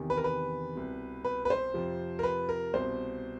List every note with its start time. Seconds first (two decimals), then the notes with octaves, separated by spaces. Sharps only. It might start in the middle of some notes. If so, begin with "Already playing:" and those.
Already playing: E2 C3 D#3
0.10 B4
0.17 A#4
0.24 B4
0.76 C2 B2
1.25 B4
1.45 B4
1.50 C5
1.74 F2 C3 F3
2.19 A#4
2.23 B4
2.49 A#4
2.74 C2 B2 C5